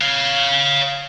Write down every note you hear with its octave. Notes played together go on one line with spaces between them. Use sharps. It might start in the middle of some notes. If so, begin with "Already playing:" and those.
C#5 F5